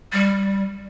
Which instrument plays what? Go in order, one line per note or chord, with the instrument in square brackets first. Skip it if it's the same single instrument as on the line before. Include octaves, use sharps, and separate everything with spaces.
[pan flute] G3